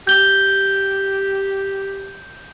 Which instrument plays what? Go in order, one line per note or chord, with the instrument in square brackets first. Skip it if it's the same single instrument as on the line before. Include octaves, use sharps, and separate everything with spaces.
[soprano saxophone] G4 [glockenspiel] G6 G7